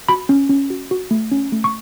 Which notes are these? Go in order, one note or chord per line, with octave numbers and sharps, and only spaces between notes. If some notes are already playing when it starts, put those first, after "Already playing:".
F#4 B5
C#4
C#4
F#4
F#4
A3
C#4
A3
C#6